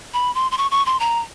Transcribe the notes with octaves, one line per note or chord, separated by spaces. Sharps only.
B5
C6
C6
C#6
C#6
C6
A#5